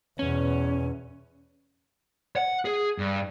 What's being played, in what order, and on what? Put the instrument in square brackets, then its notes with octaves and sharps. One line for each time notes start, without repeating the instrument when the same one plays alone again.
[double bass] E2 B2 [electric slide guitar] C#4
[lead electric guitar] F#5
G#4
G2